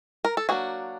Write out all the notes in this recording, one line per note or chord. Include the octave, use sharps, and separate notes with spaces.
A#4
A4
F#3 A#3 D4 F#4 G#4